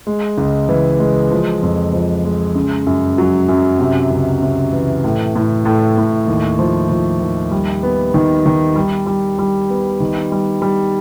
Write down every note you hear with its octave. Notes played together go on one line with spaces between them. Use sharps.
G#3
C#2
E3
G#3
F3
F2
F3
G#3
C#3
F#2
F#3
F#2
C3
C#2
C3
E3
A2
A2
A2
A2
D#2
F3
F3
D#2
G3
B3
D#3
D#3
G3
G3
G3
B3
D#3
G3
G3